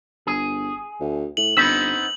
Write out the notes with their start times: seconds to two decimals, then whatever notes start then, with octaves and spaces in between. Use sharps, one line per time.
0.27 G1 G#4
1.00 D2
1.37 A2 F#7
1.57 G1 B3 C4 D#4 B5 E6